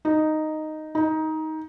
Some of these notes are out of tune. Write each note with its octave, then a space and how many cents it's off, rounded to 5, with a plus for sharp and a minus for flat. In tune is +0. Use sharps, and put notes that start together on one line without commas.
D#4 -5
D#4 +15